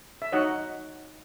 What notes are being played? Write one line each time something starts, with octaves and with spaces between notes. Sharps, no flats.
E5
D#4 F#4 C#5 D#5 F#5